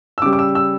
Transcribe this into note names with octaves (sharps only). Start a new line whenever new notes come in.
E6
C#3 G3 D6
D6
E6
E6